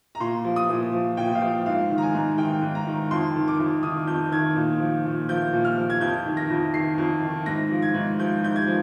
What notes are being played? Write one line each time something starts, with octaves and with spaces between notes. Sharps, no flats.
A#5
A#2 C6
F3
D#6
A#2
F3
A#2 G5
F5
F3 G5
G#2 F5
D#3
A#5
G#5
G#2
D#3 G5
G#2
A#5
D#3
F2 C6
D#3
D6
F2
D#3 D#6
F2 G6
D#3 G#6
A#2
F3
A#2
F3 G6
A#2
F6
F3
G#6
F2 G6
D#3
A#6
F2
D#3 C7
F2
D#3
G#2 A#6
F3
G#6
G#2
F3 G6
G#2 G6
G#6
F3